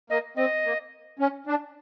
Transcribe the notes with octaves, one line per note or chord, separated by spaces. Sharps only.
A#3 D#5
C4 D#5
A#3
C#4
D4